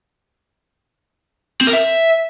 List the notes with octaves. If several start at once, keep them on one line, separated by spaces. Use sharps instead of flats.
C4
A#4
E5